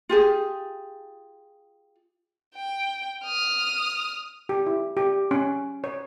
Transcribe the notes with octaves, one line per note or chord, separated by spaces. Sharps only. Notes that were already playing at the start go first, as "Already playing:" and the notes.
F4 G4 G#4
G5
D#6 F6
G4
E4
G4
C#4
C#5